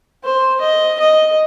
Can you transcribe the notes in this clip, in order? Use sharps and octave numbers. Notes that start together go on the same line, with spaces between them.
C5
D#5
D#5